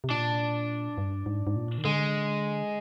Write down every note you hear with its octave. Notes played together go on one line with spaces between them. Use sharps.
C3
A#2 D4
G2
G#2
G#2
A#2
D#3
D3 G#3